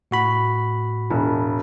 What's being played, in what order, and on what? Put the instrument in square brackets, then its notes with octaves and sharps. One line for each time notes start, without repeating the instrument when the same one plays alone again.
[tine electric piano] A2 F#4 B5
[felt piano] E1